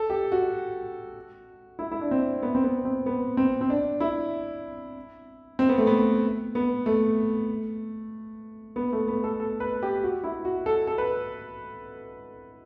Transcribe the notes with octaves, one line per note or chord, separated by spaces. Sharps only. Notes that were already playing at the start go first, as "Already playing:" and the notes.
Already playing: A4
G4
F#4
E4
E4
D4
C4
B3
C4
B3
C4
B3
C4
C4
D4
E4
C4
B3
A3
B3
B3
A3
B3
A3
B3
A4
A4
B4
G4
F#4
E4
F#4
A4
A4
B4